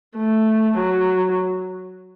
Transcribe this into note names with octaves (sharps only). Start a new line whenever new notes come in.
A3
F#3